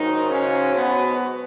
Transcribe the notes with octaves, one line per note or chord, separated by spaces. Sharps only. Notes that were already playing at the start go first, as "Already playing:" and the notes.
Already playing: G#2 D#3 F#3 D#4
C#3 C#4
B2 B3